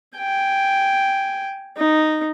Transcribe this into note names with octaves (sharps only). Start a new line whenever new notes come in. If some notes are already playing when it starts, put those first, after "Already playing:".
G5 G#5
D#4